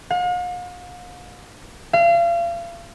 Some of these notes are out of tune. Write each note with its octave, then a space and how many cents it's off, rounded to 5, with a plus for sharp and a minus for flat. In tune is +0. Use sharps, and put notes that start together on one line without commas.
F5 +45
F5 -35